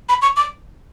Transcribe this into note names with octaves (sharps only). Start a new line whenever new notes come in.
B5
C#6
D6